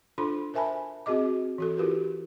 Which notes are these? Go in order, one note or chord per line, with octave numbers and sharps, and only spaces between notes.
D4 F4 A4 C5 B5 C6
A#4 C5 E5 G#5 A5 B5
C4 F#4 G#4 D#5 D6
E3 F#4 A4
E4 F4 G4 A#4 B4